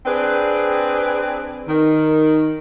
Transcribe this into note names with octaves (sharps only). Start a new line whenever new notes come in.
C4 D4 G#4 B4
D#3